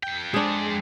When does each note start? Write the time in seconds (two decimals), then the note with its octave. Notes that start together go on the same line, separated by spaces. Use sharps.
0.03 F2 G5
0.34 G#3 D4 G#4